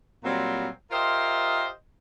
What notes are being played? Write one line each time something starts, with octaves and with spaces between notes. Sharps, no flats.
A#2 F#3 G3 C4
F4 G4 A#4 C5 D#5 E5